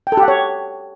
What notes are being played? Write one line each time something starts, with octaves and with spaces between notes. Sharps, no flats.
G5
A4
G4
F#5
C#5